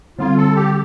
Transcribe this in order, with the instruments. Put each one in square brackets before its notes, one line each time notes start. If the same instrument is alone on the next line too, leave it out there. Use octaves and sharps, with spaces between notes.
[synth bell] D3 G3 C4 [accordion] F4
[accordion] A4
G4